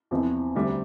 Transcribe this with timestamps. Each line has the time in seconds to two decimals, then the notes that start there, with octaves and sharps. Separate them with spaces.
0.11 E2 C3 F3 C4 E4
0.55 D2 C3 G3 C4